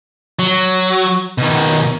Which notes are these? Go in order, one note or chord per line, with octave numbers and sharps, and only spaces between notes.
F#3
B2 D#3